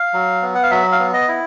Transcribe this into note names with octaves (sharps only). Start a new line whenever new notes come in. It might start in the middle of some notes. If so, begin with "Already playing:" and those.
Already playing: F5
F#3
B3
F#5
F5
F#3 E5
F5
B3
D#5
E4